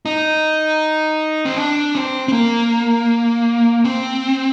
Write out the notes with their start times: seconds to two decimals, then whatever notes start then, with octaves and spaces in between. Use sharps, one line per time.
0.06 D#4
1.45 C4
1.57 D4
1.95 C4
2.28 C4
2.33 A#3
3.85 C4